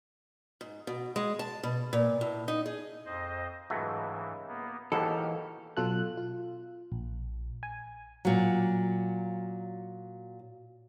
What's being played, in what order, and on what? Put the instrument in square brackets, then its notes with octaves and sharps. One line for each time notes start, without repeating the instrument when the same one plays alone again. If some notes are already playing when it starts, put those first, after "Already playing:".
[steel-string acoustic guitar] G#2
B2
G#3
A5
B2
A#2
A2
D#4
G#4
[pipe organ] F2 C5 D#5
[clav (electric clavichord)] C#2 F#3 A3 [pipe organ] G#2 E3
[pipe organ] A#3 B3
[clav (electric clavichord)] D#2 G#2 B2 [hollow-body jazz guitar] E3 A4 [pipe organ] G4 F6
[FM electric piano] B2 F#3 F4 A4 F#6
F4
A#1
G#5
[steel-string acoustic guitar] A#2 F#3